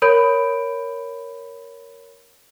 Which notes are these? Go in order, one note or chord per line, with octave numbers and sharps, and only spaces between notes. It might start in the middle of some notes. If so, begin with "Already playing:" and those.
A#4 C#5 B5 G6 D7